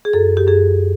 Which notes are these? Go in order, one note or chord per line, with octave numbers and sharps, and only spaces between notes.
G#4
F#2 A4
G4
F#2 G#4